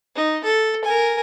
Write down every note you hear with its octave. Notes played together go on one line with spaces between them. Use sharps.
D#4
A4
A#4 G#5